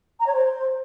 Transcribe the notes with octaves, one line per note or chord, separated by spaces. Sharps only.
A#5
C#5
C5